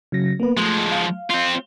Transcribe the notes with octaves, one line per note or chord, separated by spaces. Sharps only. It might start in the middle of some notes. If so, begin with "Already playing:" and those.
C#3 F#3 A#6
A#3 B3 B4
F3 G#3 A3
F5
C4 F4